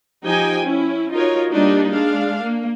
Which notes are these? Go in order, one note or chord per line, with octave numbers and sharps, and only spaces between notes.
F3 D#4 G4 G5 G#5
C#4 E4
D#4 F4 F#4 A#4 C#5
G3 A#3 D4 D#4 F4
G#3 D4 F5
A#3